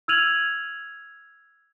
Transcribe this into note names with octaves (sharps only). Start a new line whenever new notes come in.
E6 F6 G#6 D#7 F7 F#7